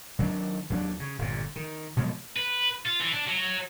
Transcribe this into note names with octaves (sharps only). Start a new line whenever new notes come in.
D#3 F#3 C#4 D4
D#2 F#3 C4 D4
C#3
G1 A#2
D#3
B2 F3 F#3 G#3
B4
F4
E3
D4
F#3